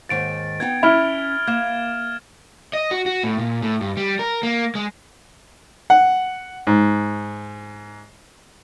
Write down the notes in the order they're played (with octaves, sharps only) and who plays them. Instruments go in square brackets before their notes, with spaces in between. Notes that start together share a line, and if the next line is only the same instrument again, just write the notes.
[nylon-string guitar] D#2 G#2 D#3 [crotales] A6 D7
[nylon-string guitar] B3 D#4 G5 [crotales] G#6
[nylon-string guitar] C#4 [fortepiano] E4 [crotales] F6 F7
[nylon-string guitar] A#3 [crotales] G#6 E7
[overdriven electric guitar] D#5
F#4
F#4
A2
A#2
A2
G2
G3
A#4
A#3
G#3
[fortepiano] F#5
G#2